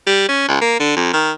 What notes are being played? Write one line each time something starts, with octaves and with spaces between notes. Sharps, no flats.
G3
C#4
C#2
A#3
D3
F2
D#3